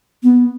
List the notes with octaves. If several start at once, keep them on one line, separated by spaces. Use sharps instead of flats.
B3